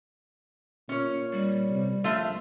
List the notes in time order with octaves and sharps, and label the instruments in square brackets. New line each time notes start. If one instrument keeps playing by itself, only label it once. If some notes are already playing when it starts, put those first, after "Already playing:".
[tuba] A#2 [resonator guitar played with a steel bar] C#4 C#5
[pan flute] G3
[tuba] C3
[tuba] A#1 [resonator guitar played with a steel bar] A3 F4 E5